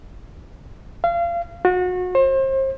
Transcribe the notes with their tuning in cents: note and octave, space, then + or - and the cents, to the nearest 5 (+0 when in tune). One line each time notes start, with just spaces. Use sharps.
F5 -30
F#4 -30
C5 +35